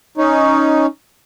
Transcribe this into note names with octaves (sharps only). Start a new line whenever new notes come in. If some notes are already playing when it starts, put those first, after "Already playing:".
C#4 D#4